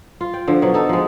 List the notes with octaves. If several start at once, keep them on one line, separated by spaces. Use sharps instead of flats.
F4
G5
D3 F3
B2 F#3
D#4 A4
F3 G#3